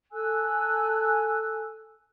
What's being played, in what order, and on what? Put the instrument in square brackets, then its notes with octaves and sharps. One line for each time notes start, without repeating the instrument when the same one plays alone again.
[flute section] A4 G#5 E6 F#6